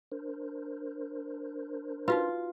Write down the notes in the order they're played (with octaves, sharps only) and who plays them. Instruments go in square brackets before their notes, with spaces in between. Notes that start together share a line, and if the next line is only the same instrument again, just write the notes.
[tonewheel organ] D4 A#4 C5
[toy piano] D#4 F#4 B4 [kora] F4